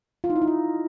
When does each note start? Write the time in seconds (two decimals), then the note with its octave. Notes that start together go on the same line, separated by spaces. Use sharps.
0.24 F4
0.30 D#4
0.36 E4
0.42 D#4
0.47 F4